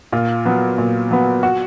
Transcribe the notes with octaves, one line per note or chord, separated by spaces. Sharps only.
A#2 F4
F#3 B3
A#2
F#3 B3
F#4